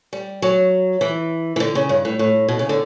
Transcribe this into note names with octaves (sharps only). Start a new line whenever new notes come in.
G3
F#3
E3
E3
D3
C#3
G2
A2
A2
B2
C#3
D3